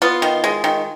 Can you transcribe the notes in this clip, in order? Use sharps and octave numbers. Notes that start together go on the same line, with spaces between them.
B3 F4
D#3
G#3
D#3